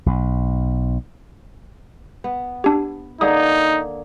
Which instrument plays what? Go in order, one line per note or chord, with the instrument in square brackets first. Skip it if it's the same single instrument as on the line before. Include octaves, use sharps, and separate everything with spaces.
[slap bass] B1
[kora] B3
[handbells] D4 G4
[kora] D3 A#3 G#4 [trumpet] D#4 [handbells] D#6